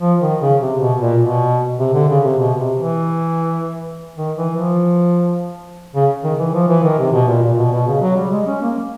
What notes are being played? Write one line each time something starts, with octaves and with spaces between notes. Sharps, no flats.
F3
D#3
C#3
C3
B2
A#2
B2
C3
D3
C#3
C3
B2
C3
E3
D#3
E3
F3
C#3
D#3
E3
F3
E3
D#3
C3
B2
A#2
A#2
B2
B2
C#3
F#3
G3
G#3
C#4
A#3